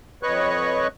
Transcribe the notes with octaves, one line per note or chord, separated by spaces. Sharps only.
F2 B4 C#5 D#5 C#6 F#6